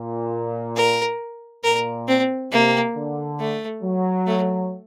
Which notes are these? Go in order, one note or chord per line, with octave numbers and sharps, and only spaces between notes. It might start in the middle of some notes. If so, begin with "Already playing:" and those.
Already playing: A#2
A#4
A#2 A#4
C4
C3 A#3
D3
A3
F#3
A3